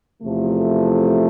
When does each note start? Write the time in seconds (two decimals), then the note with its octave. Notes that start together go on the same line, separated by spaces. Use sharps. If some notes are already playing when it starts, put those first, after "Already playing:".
0.23 E2 C3 F3 A3